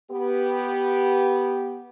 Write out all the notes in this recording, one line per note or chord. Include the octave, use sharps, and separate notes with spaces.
B3 G4